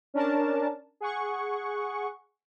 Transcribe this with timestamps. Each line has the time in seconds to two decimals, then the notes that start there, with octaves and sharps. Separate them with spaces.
0.14 C#4 D4 A#4 A5
1.00 G#4 F#5 C#6